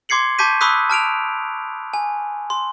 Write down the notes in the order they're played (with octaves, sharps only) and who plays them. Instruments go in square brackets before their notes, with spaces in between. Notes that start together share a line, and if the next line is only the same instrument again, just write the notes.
[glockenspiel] C6 D6 G#6 C7 C#7 F#7
A5 C#6 D6 G6 B6 D#7
B5 C#6 D#6 E6 F#6 B6
A5 F6 D7 F7
G#5
C6